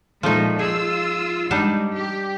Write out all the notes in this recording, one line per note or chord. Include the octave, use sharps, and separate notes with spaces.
A#2 F3 G#3 A3 D#4
F4 G#4 E6
G#2 G3 D4 D#4
G4